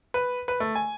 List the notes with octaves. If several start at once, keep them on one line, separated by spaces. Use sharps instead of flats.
B4
B4
A3
G#5